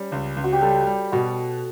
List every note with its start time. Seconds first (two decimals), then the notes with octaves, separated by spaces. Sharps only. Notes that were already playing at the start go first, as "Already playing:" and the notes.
Already playing: G3 C#4
0.12 C#2
0.37 C#2
0.44 F#4
0.53 G4
0.61 G3 A4
0.86 G3
1.12 B2 F#4